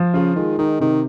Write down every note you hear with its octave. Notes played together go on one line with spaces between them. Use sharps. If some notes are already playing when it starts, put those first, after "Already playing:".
Already playing: F3
C#3 F4
D#3 G#3
D#3 D#4
C3 D#3